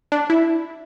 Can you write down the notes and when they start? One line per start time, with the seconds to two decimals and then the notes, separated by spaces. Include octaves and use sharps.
0.12 D4
0.30 E4